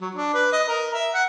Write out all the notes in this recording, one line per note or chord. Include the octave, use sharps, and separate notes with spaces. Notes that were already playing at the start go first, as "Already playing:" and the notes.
F#3
D4
B4
D#5
A#4
E5
F#5